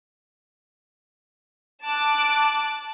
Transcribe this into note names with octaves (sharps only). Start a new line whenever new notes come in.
A5 D6 F#6